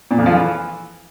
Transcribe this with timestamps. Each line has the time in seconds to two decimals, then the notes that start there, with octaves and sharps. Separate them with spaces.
0.11 A#2
0.18 F2
0.26 F3
0.34 E3